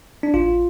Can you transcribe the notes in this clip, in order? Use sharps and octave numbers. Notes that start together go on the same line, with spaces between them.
D4
A1 F4